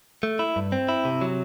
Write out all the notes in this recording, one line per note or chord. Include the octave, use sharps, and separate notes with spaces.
A3
E4
G2
C4
E4
C3
F#3